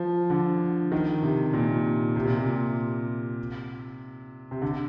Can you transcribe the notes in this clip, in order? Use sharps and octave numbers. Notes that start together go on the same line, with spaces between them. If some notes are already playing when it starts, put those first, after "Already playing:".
Already playing: F3
D3
D#3
C3
A#2
C3
A#2
C3
C3
D3